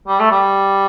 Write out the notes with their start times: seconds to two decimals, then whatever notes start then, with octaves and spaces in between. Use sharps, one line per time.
0.08 G3
0.20 A3
0.31 G3